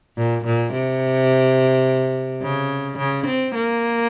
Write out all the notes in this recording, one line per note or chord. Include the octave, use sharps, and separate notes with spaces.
A#2
A#2
C3
C#3
C#3
C4
A#3